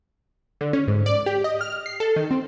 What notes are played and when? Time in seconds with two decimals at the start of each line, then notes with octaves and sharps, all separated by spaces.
0.61 D3
0.73 C#4
0.88 G#2
1.06 D5
1.26 G4
1.44 D#5
1.61 F6
1.86 C7
2.00 A4
2.16 D#3
2.31 C4